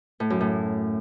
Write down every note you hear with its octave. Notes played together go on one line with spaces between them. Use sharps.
A2
F#2
A2